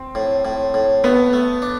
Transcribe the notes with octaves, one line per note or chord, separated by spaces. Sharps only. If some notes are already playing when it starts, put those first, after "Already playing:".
Already playing: C4
A2
A2
A2
A3 B3
A3
D4